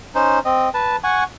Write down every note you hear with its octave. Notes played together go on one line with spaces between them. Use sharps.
C#4 D#4 C5
C4 D#5
B4 A5
F#5 G#5 C#6